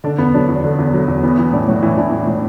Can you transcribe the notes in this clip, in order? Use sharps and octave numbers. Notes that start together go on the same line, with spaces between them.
D3 D4
E2 B3
F#3 D4
E2
D3
E2
F#3
E2
E3 B3
E3
A2 D4
A2 F#3 F#4
E3 E4
E3 D4
A2
A2